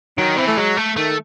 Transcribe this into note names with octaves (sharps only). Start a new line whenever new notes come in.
D#3 F#3
E3 C4
A3
F#3 G#3
A3
D#3 A3